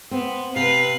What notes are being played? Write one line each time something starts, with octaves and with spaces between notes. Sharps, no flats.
B3 C4
C3 B4 F5 B5